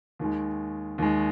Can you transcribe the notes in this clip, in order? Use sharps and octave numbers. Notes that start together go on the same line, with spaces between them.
D#2 D#3 G#3
D#2 D#3 G#3